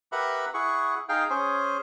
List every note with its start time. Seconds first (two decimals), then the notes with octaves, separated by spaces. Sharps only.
0.12 G4 A#4 B4 E5 F#5 B5
0.54 E4 G#4 F#5 C#6
1.09 D#4 G#4 F5 G5
1.30 C#4 G#4 C5